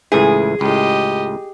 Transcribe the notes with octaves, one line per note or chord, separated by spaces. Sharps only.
C#2 A2 E3 G#4
C#2 A2 G4 D#5